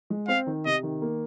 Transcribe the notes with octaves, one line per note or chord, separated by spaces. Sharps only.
G#3
C4 F5
D#3
C3 D#5
D#3
A#3